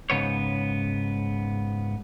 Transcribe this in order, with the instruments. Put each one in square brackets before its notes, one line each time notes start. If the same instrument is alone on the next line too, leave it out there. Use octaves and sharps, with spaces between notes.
[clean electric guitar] G#2 C#3 B3 C#5